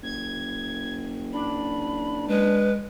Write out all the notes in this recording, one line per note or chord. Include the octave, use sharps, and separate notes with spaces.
F#1 G#6
D4 B5
G#3 B4